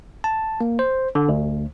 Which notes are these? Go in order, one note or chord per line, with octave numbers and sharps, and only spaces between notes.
A5
A#3
C5
D3
D2